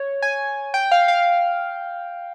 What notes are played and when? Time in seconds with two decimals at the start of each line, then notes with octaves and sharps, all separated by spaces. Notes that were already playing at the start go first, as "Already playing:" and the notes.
Already playing: C#5
0.22 G#5
0.74 G5
0.91 F5
1.08 F5